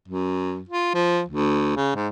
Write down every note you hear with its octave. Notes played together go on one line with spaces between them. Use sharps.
F#2
F4
F3
D2
C#3
G#2